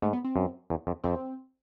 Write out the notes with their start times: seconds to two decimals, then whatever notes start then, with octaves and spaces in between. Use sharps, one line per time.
0.02 G#2 A3
0.13 B3
0.25 C4
0.36 F#2
0.70 E2
0.87 F2
1.03 F2 C4